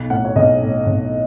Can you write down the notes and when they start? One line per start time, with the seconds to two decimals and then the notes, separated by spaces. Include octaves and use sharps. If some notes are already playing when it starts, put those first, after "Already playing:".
Already playing: B1
0.10 A2 F#5
0.25 C#5
0.36 B1 D#5
0.61 A2
0.86 B1